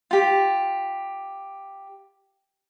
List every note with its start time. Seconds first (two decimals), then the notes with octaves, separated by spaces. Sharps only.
0.11 F4 G4